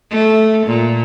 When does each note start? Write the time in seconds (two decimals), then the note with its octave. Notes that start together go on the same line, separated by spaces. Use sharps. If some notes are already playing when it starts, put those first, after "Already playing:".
0.11 A3
0.66 A#2